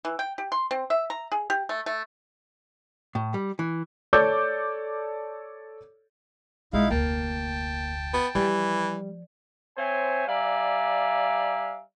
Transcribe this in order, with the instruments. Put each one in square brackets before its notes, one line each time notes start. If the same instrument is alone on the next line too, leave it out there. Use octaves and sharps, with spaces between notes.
[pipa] E3
G5
G4
C6
C4
E5
A#5
G#4
G4
A3
A3
[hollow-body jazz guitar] A2
G3
E3
[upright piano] A4 C#5 D5 D6 E6 G6
[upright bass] B1 [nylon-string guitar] G#3 [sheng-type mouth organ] D#4 E4 F5
[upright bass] F1 D2 [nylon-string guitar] A#3 [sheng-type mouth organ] G5 A5
[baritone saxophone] B3
[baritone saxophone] E3 [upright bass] F3 [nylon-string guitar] G3
[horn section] C4 C5 C#5 E5 G#5
G3 D5 E5 F5 G#5 A#5